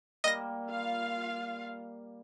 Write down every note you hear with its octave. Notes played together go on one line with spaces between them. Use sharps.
G3 A#3 D#5 A#6
F4 F5